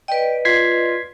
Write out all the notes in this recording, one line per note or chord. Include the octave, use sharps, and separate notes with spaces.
B4 D5 D#5 G5
F4 G#6 B6 C7